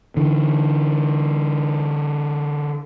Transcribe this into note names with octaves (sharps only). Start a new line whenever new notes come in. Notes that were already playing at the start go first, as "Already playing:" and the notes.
D3 E3